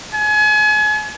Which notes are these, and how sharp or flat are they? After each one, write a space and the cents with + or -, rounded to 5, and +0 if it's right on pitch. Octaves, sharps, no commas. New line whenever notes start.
G#5 +35